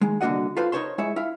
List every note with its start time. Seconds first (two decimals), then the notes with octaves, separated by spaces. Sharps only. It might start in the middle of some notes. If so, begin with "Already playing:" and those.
0.01 D#3 G#3
0.21 C2 D3 A#3 F#4 D#5 F#5
0.57 F4 A4 B4 C5 F5
0.72 D#4 A#4 C5 C#5 A5 C6
0.98 G#3 E4 G#4 C#5 E5
1.16 E4 E5 F5